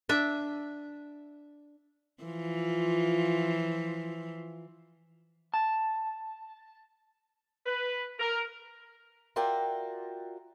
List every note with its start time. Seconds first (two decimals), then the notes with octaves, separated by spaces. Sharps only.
0.09 D4 E5
2.24 E3 F3 F4
5.54 A5
7.66 B4
8.19 A#4
9.36 F4 F#4 A#4 D5 E5 G5